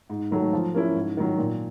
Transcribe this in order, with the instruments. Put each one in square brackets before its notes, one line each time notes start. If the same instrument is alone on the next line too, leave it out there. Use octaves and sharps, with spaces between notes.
[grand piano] G#2
D#3 F#3 A3
F3
A#3 C#4 E4
G#2
D#3 F#3
A#2